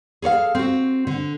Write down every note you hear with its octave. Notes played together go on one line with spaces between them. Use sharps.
G#4 A4 C#5 F5
C4 F#4
D3